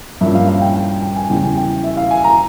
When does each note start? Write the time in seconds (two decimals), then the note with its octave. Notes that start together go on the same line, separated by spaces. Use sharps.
0.21 G2 F3 A#3 C#4 E5
0.35 F5
0.48 F5
0.61 G5
0.75 G5
1.03 G5
1.16 G#5
1.29 E2 C#3 E3 G3 G5
1.44 G#5
1.57 G5
1.84 E5
1.97 F5
2.11 G#5
2.24 A#5